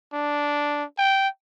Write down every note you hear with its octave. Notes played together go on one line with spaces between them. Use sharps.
D4
G5